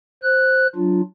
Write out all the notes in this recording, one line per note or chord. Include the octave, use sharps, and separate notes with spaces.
C5 F#6
F#3 D4 F4